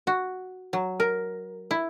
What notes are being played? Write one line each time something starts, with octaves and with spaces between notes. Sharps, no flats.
F#4
F#3
A#4
E4